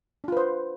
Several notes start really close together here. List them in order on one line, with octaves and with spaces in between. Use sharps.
D4 F4 B4 C5